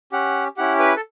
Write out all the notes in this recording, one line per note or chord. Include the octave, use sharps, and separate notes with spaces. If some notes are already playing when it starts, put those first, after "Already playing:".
C#4 G4 F#5
C#4 E4 G4 F#5
B4
A4